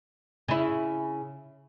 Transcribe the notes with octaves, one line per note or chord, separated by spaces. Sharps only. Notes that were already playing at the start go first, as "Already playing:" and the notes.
C#3 E4